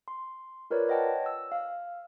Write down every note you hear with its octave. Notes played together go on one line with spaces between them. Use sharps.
C6
F4 A#4 B4 C#5 D5
C#5 D#5 F#5 G5 A5
E6
F5